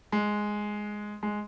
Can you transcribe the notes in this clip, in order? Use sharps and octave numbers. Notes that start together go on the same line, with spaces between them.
G#3
G#3